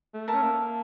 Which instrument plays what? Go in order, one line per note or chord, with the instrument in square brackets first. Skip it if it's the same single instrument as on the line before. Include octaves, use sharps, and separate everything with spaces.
[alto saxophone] A3
[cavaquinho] A#4 E5 A5
[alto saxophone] C#4
A#3